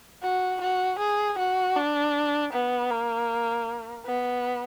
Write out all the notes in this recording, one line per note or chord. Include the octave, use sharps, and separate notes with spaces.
F#4
F#4
G#4
F#4
D4
B3
A#3
B3